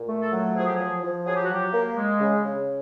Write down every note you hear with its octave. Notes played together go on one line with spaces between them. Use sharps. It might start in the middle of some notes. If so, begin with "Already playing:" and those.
Already playing: A#2
A3
A4
F#3
F3 G#4
G4
F3 G#4
F3
F#3 G#4
G4
F#4
F#3 G4
A#3
G#3
C#3
C#3